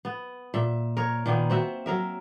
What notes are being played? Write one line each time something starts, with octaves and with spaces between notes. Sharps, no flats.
B3
A#2 E5
A#4 C#5
A#2 D#3 A#3 B3
C4 F#4 E5
F#3 A#4 E5